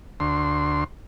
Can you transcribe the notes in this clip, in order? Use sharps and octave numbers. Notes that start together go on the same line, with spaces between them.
D2 C6